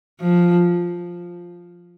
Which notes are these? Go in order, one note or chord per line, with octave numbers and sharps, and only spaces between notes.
F3